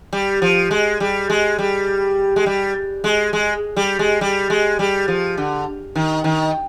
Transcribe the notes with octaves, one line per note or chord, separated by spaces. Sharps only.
G3
F3
G#3
G3
G#3
G3
G#3
G3
G#3
G#3
G3
G#3
G3
G#3
G3
F3
D3
D#3
D#3